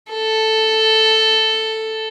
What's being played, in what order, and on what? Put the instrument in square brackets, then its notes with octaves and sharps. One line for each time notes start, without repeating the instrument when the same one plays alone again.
[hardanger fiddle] A4